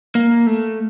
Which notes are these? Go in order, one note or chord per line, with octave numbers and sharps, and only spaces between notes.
A#3
A3